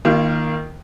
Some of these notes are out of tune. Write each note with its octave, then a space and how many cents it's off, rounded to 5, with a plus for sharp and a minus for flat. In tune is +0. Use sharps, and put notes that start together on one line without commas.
D#3 +0 A#3 +0 F4 -35